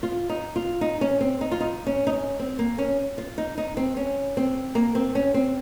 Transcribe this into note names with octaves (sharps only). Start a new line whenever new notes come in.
F4
D#4
F4
D#4
C#4
C4
D#4
F4
D#4
C#4
D#4
C#4
C4
A#3
C#4
F4
D#4
D#4
C4
C#4
C4
A#3
C4
C#4
C4